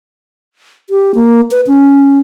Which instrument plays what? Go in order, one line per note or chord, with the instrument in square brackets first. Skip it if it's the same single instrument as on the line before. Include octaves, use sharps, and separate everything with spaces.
[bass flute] G4
A#3
B4
C#4